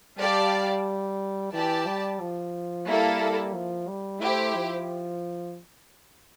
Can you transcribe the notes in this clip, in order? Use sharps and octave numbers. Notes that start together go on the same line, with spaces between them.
G3 G4 D5 F5 A5
E3 G4 D5 A5
G3
F3
G3 A#3 E4 A4
F3
G3
A3 E4 G4 C5
F3